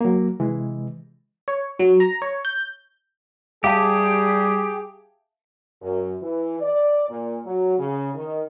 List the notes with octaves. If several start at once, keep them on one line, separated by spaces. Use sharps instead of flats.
F#3 A#3
C3 E3 G#3
C#5
F#3
A#5
C#5
G6
G3 G4 G#4 E5 F5 A5
F#2
E3
D5
A#2
F#3
C#3
D#3